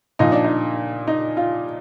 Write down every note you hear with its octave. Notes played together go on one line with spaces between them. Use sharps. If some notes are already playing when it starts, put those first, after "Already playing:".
A#2 F3 D#4
D4
D#4
D#4
F4